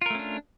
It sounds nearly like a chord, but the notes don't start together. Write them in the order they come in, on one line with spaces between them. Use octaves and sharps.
F4 A#4 A3 C#4 D4